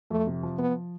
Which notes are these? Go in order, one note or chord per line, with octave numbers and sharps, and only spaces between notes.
F2 A3
C3
F3
F3 B3